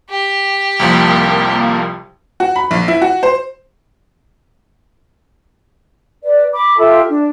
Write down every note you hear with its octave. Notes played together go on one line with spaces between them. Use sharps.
G4
C2 F2 F3 A#3
F#4
B5
A#1
E4
F#4
C5
B4 D5
B5 D6
F4 G4 A4 E5
D4